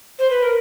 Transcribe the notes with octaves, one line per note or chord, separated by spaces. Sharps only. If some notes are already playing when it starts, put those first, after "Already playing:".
C5
B4
A#4